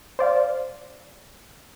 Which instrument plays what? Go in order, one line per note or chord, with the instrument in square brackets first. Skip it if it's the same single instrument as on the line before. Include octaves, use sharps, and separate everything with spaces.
[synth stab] C5 D5 F5